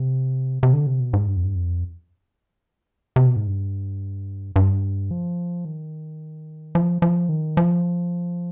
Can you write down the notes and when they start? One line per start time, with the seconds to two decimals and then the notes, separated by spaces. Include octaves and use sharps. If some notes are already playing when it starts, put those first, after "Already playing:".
Already playing: C3
0.63 C3
0.73 D3
0.87 C3
1.00 B2
1.13 G#2
1.28 G2
1.36 F2
1.44 G2
1.55 F2
3.16 C3
3.27 B2
3.36 G#2
3.47 G2
4.56 G2
5.11 F3
5.65 D#3
6.75 F3
7.02 F3
7.29 D#3
7.57 F3